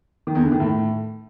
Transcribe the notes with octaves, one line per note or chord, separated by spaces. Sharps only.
D#3
E2
D3
D#3
A2